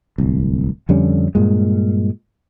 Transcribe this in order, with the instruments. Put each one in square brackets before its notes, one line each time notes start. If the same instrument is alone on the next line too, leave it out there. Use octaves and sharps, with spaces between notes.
[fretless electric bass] D1 C2
F2 D3 G3 C#4
G2 A#2 G#3